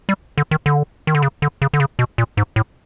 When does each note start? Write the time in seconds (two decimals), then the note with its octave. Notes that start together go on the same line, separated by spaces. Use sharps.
0.09 G3
0.38 D3
0.51 D#3
0.66 D3
1.07 D#3
1.15 D3
1.22 C#3
1.42 D3
1.62 C#3
1.74 D3
1.80 C#3
1.99 B2
2.18 A#2
2.37 G#2
2.56 A2